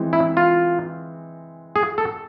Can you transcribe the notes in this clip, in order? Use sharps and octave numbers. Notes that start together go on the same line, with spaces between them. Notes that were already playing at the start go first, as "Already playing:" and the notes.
Already playing: E3 G#3 C4 B4
E4
F4
G#4
A4